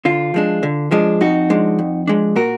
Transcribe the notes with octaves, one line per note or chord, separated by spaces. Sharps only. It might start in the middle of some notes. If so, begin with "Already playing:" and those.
D3 F4
F3 G#3 D4
D3
F3 G#3 D4
F2 D#4 F#4
F3 G#3 D4
F2
F3 G#3 D4
A#2 F#4 A#4